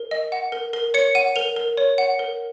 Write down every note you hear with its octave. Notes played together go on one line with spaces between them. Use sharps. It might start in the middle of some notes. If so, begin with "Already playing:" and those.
Already playing: A#4
D#5
F#5
A#4
A#4
C#5 C#7
F#5 D#7
A#4 F7
A#4
C#5
F#5
A#4